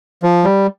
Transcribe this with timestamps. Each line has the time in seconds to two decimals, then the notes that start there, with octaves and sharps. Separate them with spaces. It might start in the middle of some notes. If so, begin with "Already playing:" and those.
0.23 F3
0.44 G3